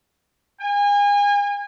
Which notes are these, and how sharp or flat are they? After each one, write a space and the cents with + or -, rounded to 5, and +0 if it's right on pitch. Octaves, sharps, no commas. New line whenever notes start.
G#5 -35